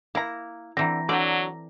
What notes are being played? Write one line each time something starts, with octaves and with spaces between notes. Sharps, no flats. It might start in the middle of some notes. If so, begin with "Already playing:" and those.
A#3 E4 A#5
D3 E3 C4 A#5 A#6
D3 F#3 D5 G5